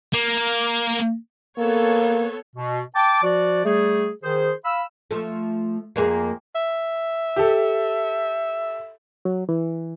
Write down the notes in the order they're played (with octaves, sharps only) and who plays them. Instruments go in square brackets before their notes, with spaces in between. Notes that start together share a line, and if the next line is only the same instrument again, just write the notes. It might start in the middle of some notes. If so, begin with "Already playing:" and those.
[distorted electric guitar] A#3
[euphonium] A#3 [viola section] B3 A4 C#5
[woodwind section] B2
G5 A5 D6
F3 F#4 D5
G3 A3 G#4
D#3 G#4 C5
F5 B5 E6
[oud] F3 A3
F2 A#3 G#4
[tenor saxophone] E5
[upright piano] G4 A4
[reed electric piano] F#3
E3